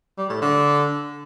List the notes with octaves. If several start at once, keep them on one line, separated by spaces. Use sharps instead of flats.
G3
A2
D3